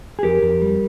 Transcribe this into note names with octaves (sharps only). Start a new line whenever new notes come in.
G#4
F2 G4 A#4
F2
G3